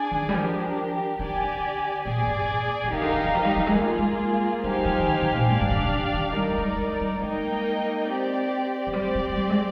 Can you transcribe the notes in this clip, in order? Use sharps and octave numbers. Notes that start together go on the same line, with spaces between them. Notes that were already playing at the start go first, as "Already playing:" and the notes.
Already playing: D4 G#4 D5 G#5
D#3
G3
F3 D4 G4 A#4
D#3 G4 D5 G#5
D3
A#2 G#4 D5 G#5
G#2
A#2
A#2
C3 D#4 G4 A#4 F5
D3
D#3
D#3
F3
G3
F3
G#3
G3 A#3 F4 G#4
G#3
G3 D#4 G4 C5 F5 G#5
F3
D#3
C3
A#2
G#2 D4 G4 D5 F5
G2
D3
C3
D3
D#3
G3 D#4 A#4 D5
G#3
G3
G3
G#3 A#3 D#4 A#4 D#5 G5
C4 G4 D5
F3
G3 C4 G4 D5
G3
G3
G#3